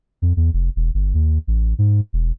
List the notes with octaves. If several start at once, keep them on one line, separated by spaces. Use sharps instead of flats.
F2
E2
F1
E1
G1
D#2
A1
G#2
E1